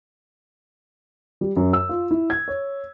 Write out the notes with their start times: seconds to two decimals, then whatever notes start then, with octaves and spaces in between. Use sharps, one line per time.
1.41 G3
1.56 F#2
1.73 E6
1.89 F4
2.11 E4
2.30 G#6
2.48 C#5